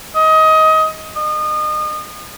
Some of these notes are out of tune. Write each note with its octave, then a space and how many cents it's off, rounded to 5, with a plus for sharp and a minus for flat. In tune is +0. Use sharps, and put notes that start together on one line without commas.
D#5 +25
D#5 -30